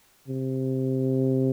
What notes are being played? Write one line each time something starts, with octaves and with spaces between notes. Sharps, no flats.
C3